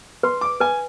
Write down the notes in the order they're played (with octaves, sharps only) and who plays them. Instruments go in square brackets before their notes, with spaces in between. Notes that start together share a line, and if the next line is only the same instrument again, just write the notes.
[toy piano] B4 [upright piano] C6
[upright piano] D6
[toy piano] B4 [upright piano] G#5